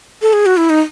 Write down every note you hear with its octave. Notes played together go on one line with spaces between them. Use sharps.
A4
G#4
F#4
E4
D#4